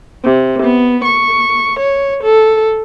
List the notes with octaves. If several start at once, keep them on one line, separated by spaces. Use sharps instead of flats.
C3
B3
C#6
C#5
A4